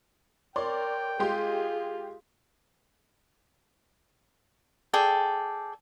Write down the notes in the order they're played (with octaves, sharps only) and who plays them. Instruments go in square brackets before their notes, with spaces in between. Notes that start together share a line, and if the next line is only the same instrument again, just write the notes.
[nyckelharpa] A#4 [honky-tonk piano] C#5 D5 C6 [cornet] G5
[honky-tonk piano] G#3 G4 C6 [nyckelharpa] F4 [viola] G#4
[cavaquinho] G#4 A4 D5 G5